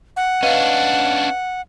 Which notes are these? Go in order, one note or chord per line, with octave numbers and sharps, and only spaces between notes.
F#5
C#4 D4 B4 D#5 F5